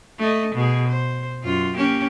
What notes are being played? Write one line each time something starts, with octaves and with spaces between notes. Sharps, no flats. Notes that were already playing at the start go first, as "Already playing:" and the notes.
A3 D#5
B2 G#4
C5
F#2 F4
A#3 C#4 G4